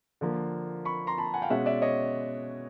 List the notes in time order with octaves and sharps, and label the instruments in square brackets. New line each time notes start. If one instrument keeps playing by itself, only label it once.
[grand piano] D3 F3 A#3
B5 C#6
A#5 C6
A5 B5
F#5 G#5
F5 G5
B2 G#3 C#4 E5 F#5
D5 E5
C#5 D#5